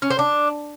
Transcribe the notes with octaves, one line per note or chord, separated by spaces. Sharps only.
C#4
C5
D4